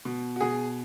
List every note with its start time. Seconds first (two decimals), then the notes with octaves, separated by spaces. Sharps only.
0.05 B2
0.36 F#4
0.41 B2 G#4